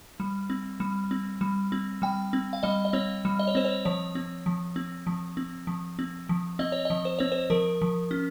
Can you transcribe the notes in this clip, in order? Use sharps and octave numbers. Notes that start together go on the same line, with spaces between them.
G3
C4
G3
C4
G3
C4
G3 G5
C4
F5
G3 D#5
D#5
C4 C#5
G3
D#5
C#5
C4 C5
C#5
F3 C#5
C4
F3
C4
F3
C4
F3
C4
F3
C4 D#5
C#5
F3 D#5
C5
C4 C#5
C5
F3 A#4
F3
C#4